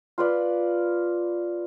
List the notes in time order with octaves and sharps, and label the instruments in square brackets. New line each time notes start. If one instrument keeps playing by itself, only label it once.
[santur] F4 B4 D5